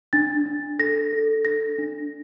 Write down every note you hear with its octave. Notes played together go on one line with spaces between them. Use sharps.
D4 A6
D4
A4 A#6
A4
D4 A#6
D4